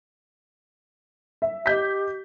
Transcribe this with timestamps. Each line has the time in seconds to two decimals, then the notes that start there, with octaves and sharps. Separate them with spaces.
1.42 E5
1.66 G4 D#5 G6 B6